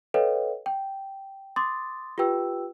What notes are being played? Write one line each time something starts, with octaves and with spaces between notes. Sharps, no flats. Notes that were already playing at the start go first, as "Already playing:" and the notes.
A4 B4 C#5 D#5 F5 G5
G5
C6 D6 D#6 A6
F4 G4 B4 G5 E6